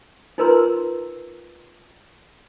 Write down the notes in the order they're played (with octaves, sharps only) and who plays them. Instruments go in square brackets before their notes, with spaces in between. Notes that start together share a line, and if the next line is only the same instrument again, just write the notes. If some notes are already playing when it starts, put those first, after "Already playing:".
[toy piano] D#4 F4 A#4 B4 A#5 C6